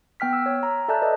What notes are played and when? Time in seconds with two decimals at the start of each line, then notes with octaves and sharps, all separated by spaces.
0.20 B3 G5 F6 B6
0.33 E6
0.46 C#5
0.63 A#5
0.88 A4 D5 E5 A5 F#6 G6
1.02 A4 B4 D5 D#5